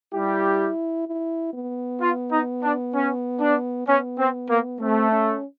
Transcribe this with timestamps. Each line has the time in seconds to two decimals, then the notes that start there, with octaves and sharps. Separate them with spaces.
0.14 G3 E4 G4
1.07 E4
1.53 B3
2.01 F4
2.31 D#4
2.63 D4
2.94 C#4
3.41 D4
3.88 B3 C#4
4.19 C4
4.50 A#3
4.81 A3 C4
5.12 C#4